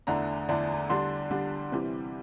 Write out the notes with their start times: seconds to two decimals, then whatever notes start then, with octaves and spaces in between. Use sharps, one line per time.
0.07 E2 D3 A3 D4 A#5
0.49 E2 D3 A3 D4
0.90 D3 G3 D4 C6
1.31 D3 G3 D4
1.72 C3 E3 G3